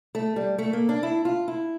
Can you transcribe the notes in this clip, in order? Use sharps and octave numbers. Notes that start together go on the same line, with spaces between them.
A3
G3
A3
A#3
D4
E4
F4
E4